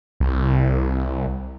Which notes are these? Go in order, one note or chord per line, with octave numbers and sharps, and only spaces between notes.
C2